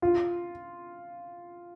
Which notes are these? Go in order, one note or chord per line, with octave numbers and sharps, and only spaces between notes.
F4